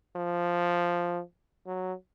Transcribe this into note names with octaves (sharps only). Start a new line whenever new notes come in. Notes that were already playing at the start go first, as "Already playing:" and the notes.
F3
F#3